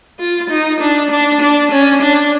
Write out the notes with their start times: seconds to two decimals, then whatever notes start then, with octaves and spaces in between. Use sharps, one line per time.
0.20 F4
0.50 D#4
0.80 D4
1.11 D4
1.41 D4
1.72 C#4
2.02 D4